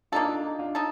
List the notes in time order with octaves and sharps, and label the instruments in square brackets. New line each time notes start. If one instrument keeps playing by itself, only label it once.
[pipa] A#3 D#4 A4 [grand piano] D4 F4
[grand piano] D4 F4
D#4
D4 F4
[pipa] D#4 A4